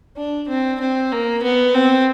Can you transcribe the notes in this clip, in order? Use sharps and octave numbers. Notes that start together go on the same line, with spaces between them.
D4
C4
C4
A#3
B3
C4